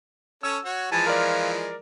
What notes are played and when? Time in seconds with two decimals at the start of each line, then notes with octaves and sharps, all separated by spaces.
0.43 C#4 A4 C#5 E6
0.65 F#4 C#5
0.92 E3 F3 G#3 G#5 A5
1.06 F4 A#4 D5